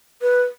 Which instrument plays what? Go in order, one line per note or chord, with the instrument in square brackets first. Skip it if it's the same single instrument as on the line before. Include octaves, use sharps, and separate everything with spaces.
[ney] B4